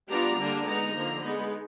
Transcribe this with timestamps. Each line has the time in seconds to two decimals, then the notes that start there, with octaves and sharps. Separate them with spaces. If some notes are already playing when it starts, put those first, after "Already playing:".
0.09 G3 B3 D4 F4 A#5
0.37 D3 G3 A#3 D4
0.65 G#3 B3 D#4 A#5
0.94 D3 F3 A#3
1.22 G#3 B3 D#4 B5